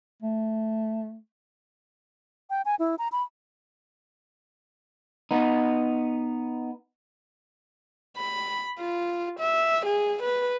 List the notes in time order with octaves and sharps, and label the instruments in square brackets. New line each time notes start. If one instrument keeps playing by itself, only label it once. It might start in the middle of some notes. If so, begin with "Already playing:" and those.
[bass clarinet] A3
[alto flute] G5
G#5
E4
A#5
B5
[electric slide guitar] B3 D#4
[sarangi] B5
F4
E5
G#4
B4